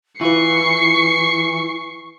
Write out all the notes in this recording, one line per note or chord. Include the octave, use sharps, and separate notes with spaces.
E3 E4 F4 B4 C#6 C7 C#7